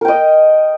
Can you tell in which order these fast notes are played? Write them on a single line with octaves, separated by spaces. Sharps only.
A#4 G5 D#5